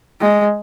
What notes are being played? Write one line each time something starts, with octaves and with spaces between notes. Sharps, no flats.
G#3